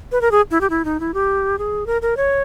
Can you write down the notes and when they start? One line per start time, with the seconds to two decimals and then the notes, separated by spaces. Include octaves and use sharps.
0.12 B4
0.21 A#4
0.31 G#4
0.51 E4
0.61 G4
0.70 E4
0.85 D#4
1.00 E4
1.14 G4
1.58 G#4
1.86 A#4
2.02 A#4
2.17 C#5